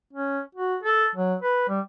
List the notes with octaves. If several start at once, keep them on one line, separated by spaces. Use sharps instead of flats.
C#4
F#4
A4
F#3
B4
G3